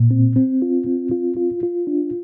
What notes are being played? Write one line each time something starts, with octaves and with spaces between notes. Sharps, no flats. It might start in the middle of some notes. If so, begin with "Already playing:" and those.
Already playing: A#2
C4
C4
F4
C4
F4
F4
F4
D4